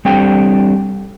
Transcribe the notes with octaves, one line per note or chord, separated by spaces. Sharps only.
G3 C4 D4 G4 A4 G5